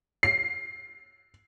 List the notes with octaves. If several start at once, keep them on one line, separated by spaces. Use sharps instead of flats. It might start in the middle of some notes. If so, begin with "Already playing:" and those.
C7